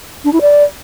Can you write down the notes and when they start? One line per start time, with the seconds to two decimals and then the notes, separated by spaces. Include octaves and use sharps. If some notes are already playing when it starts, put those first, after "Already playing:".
0.24 D4
0.33 E4
0.41 D5